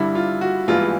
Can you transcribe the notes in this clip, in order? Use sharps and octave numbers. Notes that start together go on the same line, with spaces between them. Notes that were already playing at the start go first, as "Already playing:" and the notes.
Already playing: G2 D3 G3 E4
F4
F#4
A#1 G#2 E3 G3 B3 F4